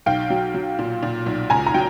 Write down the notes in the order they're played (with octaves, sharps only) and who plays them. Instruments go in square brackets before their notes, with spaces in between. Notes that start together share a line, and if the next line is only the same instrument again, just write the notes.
[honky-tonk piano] B1 F5 G5
F#3
F#3
A#2
A#2
B1
C#2 G#5 A#5
A#5
F#3 G5